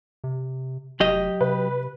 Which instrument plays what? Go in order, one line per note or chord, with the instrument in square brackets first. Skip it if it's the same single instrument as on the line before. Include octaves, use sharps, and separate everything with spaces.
[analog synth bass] C3
[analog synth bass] F1 [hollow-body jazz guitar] F#3 G4 D#5
[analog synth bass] C3 [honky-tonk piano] B4